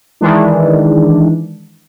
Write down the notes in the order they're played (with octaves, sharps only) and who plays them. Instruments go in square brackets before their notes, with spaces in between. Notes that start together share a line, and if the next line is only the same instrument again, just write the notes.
[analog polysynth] D#3 E3 G#3 D4